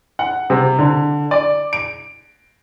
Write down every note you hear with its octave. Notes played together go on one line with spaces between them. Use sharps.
F#5
C3
D3
D5
D7